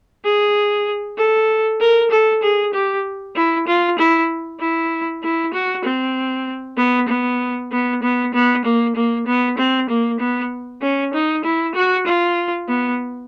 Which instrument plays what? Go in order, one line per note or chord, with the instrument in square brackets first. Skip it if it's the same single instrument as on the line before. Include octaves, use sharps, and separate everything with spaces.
[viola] G#4
A4
A#4
A4
G#4
G4
E4
F4
E4
E4
E4
F#4
C4
B3
B3
B3
B3
B3
A#3
A#3
B3
C4
A#3
B3
C#4
D#4
E4
F#4
F4
B3